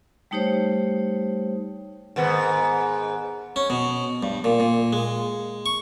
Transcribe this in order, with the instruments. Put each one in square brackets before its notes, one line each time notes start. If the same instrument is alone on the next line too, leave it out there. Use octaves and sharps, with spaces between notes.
[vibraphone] G3 A3 D#4 G4 C5 C#5
[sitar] G#2 D#3 B3
[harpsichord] C#4
B2
G2
A#2
A#2
G#3
C#6